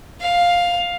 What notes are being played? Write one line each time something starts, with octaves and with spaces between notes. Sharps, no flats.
F5